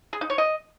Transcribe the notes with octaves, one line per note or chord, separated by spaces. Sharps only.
G#4
D#4
C#5
D#5